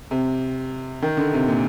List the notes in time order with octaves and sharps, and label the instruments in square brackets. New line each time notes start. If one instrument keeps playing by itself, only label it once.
[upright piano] C3
D#3
D3
C3
A#2